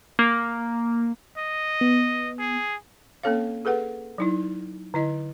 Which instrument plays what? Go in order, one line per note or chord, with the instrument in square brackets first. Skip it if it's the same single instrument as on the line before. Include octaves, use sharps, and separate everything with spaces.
[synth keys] A#3
[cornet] D#5
[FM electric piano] B3
[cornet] G#4
[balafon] A#3 C4 C#4 A4 C#5 F5
G#4 A4 B4 F#5
F#3 D#4 E4
D3 E4 D#5